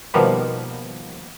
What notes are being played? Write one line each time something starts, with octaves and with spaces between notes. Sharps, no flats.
B2 D#3 F3 G3 A#3 B3